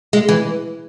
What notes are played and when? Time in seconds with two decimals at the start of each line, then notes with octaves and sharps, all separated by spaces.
0.13 G#3
0.29 E3